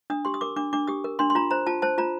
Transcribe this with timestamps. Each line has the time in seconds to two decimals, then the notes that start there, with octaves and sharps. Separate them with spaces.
0.10 D4 D#6
0.25 G4 C6
0.34 D#6
0.41 A#4 D6
0.56 D4 D6
0.73 D4 D6
0.87 G4 D#6
1.04 A#4
1.19 D4 C6
1.30 C6
1.35 F4 A#5
1.51 C5 A#5
1.67 F4 A5
1.82 C5 A5
1.98 F4 A#5